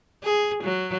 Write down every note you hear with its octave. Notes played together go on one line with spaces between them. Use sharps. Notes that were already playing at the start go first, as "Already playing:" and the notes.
G#4
F#3